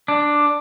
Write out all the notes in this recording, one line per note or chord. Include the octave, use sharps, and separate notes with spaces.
D4